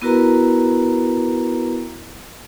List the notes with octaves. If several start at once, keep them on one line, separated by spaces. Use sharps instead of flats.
B3 E4 F#4 A#4 B4 A#5